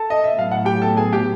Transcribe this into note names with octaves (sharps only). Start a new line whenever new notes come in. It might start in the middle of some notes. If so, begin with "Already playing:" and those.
Already playing: A4 A5
D#5
E5
A2 F#3 B3 F5
F#5
G4 G5
A4 A5
G#4 G#5
G4 G5